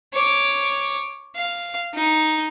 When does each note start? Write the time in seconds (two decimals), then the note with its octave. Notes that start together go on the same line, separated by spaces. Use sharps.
0.14 C#5 D6
1.36 F5
1.94 D#4